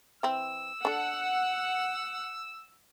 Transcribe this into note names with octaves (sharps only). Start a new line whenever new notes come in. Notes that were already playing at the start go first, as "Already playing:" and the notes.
E3 C4 E6
D4 A4 F#5